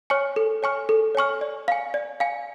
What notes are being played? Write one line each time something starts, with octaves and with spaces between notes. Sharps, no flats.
C#5 G#5 C#6 F6
A4
C#5 G#5 C#6 F6
A4
C#5 G#5 C#6 F6
D5
F5 G#5
D5
F5 G#5